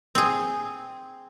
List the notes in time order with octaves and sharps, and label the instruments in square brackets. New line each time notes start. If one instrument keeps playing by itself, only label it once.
[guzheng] C4 G#4